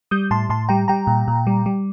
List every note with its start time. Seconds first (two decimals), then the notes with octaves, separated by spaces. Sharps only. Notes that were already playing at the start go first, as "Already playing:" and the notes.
0.11 G3 D#6 G6
0.31 A2 A5 C6
0.49 A2 A5 C6
0.69 G3 G5 A#5
0.88 G3 G5 A#5
1.07 A#2
1.28 A#2
1.47 G3
1.66 G3